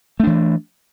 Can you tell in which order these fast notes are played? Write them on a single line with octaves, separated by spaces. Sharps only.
A3 D4 E3